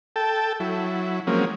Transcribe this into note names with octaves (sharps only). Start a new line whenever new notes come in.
A4 G5 A5
F#3 E4
F3 F#3 G#3 A#3 C4 C#4